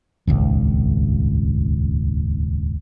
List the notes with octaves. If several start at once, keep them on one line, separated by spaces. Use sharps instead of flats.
D#1 G#1 C#2